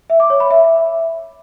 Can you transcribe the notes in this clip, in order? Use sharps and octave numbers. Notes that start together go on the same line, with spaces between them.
E5
D6
C#5
B5
E5